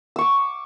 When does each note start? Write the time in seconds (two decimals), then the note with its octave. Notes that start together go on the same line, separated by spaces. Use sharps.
0.16 E6
0.18 C#6
0.21 D6